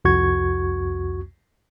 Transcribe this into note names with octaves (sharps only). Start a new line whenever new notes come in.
C2 F2 F#4 C#6 G#6